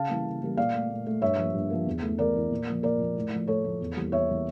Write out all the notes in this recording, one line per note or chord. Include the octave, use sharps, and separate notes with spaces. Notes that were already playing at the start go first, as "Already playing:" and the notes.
Already playing: C#3 F5 A5
E3 G3 A#3
C#3
E3 G3 A#3
A#2 D5 F5
A3
A#2
A3
G2 C#5 E5
F3 A#3
G2
F3 A#3
E2
E3 A3
E2 A#4 D5
E3 A3
A#2
F3 A#3
A#2 A#4 D5
F3 A#3
A2
F3 A3
A2 A4 C#5
F3 A3
E2
E3 G3 A#3
E2 C#5 E5
E3 G3 A#3